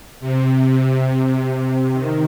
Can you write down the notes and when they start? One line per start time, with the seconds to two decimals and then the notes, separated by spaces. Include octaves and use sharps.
0.21 C3
0.64 C3
1.07 C3
1.50 C3
1.93 D#3